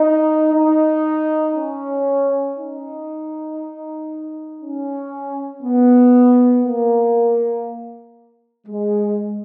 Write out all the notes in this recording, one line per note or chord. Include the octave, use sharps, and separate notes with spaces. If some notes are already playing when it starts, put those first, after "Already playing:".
Already playing: D#4
D#4
C#4
D#4
C#4
B3
A#3
G#3